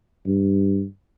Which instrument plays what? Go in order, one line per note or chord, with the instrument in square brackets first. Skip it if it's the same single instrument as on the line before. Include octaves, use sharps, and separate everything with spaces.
[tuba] G2